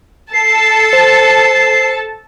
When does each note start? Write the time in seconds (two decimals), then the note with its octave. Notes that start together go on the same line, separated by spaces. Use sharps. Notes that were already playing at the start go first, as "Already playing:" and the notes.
0.33 A4 A5 C7
0.93 C5